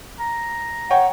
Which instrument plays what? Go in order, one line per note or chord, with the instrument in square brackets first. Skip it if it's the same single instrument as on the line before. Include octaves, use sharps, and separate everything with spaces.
[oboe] A#5
[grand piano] C#5 G5 [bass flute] F#5